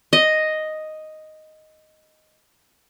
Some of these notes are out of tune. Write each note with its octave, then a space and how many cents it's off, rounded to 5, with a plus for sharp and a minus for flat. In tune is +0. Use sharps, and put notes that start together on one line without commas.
D#5 +0